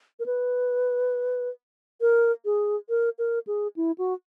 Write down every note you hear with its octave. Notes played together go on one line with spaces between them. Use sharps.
A#4
B4
A#4
G#4
A#4
A#4
G#4
E4
F#4